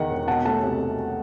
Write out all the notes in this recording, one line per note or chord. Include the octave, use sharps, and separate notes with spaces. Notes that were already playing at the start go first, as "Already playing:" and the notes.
Already playing: E2 D#3 F#5
E1
B2 F#5 A5
A3 F#5 A5
C2